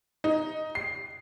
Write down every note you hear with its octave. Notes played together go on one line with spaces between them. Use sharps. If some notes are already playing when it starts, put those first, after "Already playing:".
D#4
C7